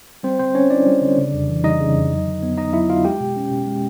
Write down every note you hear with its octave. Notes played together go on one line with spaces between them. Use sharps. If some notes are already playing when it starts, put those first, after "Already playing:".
G3 C4 C5
D3 C4 C5
C4 C#4 C#5
D4 E4 D5
G3
D3
C#3
F2
E3
G3 D#4 D#5
C#3
F2
F#3
D3
B3
D#4 D#5
F#3 E4 E5
D3 F4 F5
G#3 G4 G5
B2
C#4
B2
G#3